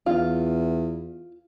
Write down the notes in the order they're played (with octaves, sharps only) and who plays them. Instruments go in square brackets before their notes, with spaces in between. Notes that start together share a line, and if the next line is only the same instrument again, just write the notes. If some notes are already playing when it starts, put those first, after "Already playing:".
[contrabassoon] E2 [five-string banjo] F4